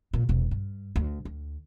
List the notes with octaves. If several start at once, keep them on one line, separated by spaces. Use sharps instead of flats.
C#2 A#2
E1 C3
G2
D2
D2